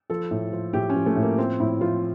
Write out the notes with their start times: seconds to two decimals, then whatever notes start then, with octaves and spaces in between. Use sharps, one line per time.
0.10 F3 A4
0.31 A2
0.53 F3
0.73 A2 G4
0.90 C#4
0.95 F3
1.06 A3
1.16 A2
1.22 A#3
1.38 F3 C4
1.60 A2 E4
1.81 F3 F4